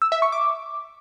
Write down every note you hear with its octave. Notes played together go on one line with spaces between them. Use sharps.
E6
E5
C#6
D6